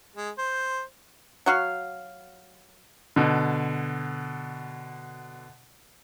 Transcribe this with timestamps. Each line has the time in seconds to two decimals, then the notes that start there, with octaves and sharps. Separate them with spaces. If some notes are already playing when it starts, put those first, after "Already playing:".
0.16 G#3
0.38 C5
1.46 F#3 F#4 F5
3.16 B2 D3